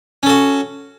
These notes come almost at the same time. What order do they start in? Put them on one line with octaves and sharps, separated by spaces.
C#4 A4 F#4